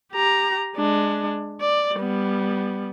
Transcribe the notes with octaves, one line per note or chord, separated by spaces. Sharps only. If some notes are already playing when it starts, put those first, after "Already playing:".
G4 A#5
G#3 D4
D5
G3 B3